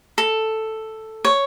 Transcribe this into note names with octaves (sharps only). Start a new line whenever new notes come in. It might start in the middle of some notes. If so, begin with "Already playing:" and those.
A4
C#5